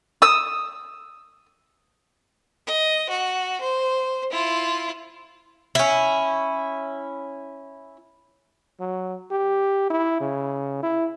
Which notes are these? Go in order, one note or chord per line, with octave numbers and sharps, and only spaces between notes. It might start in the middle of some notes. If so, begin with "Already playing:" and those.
D#6 E6
D#5
F#4
C5
E4 F4
C#4 E4
F#3
G4
E4
C#3
E4